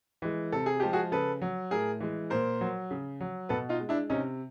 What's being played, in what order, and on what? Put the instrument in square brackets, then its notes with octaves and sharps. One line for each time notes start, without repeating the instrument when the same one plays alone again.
[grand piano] E3 G#3
C3 A4
G#4
F3 G#3 G4
F#4 G#4
C#3 A4 B4
F#3
A2 G#4 A#4
E3 G#3
A#2 A#4 C5
F#3
C#3
F#3
B2 A4 B4
D#4 F4
G#3
D4 E4
C3 C#4 D#4